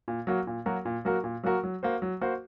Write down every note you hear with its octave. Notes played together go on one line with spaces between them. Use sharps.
A#2
F#3 A#3 F#4 A#4
A#2
F#3 A#3 F#4 A#4
A#2
F#3 A#3 F#4 A#4
A#2
F#3 A#3 F#4 A#4
F#3
A#3 F#4 C5
F#3
A#3 F#4 C5